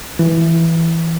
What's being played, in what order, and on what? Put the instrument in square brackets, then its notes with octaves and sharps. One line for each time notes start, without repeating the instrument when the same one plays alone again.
[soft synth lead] E3